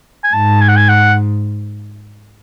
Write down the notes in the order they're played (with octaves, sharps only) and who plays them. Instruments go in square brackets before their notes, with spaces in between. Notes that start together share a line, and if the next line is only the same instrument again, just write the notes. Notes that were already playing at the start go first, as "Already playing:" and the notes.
[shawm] G#5
[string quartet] G#2 [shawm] A5
[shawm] G#5
F#5
G#5
F#5